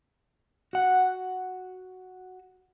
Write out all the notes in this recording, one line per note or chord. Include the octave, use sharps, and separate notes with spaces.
F#4 F#5